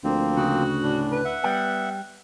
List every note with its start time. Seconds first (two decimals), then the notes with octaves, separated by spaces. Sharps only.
0.04 D2 F3 A#3 C4
0.37 C#3 F#4
0.83 A2 D4
1.12 B4
1.25 E5 F#5
1.43 G3 B3 G5